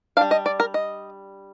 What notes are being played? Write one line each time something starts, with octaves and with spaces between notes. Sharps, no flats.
G3 D4 F5
D#5
D5
A#4
D#5